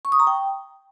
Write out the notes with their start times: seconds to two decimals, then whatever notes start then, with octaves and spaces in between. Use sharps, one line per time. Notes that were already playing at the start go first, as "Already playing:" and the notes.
0.05 C#6
0.12 D#6
0.20 A#5
0.27 G5